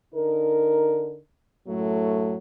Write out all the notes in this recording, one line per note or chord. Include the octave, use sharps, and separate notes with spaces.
D3 D#4 A#4
F#2 A2 F#3 A3